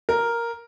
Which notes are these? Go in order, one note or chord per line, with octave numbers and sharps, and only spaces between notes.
A#4